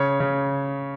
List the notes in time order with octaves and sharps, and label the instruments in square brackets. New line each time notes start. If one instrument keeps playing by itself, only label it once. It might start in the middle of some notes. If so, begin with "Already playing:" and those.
Already playing: [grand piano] C#3 C#5
C#3